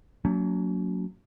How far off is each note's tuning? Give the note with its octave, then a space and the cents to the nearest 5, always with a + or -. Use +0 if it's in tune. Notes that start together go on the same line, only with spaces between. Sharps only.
F#3 -10 A#3 -30 C#4 +45